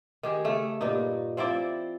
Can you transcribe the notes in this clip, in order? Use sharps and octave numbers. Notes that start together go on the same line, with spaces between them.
D#3 G4 G#4
C#3 A3
G2 A#2 D#4
F3 C4 E4 D5